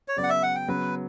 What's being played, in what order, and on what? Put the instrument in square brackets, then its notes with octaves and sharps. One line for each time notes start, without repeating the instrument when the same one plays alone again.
[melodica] C#5
[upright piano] C#3 F#3 B3 [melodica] D5
[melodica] F#5
E5
F#5
G5
[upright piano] C#3 F#3 B3 [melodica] B4